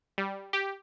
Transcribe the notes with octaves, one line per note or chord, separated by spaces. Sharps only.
G3
G4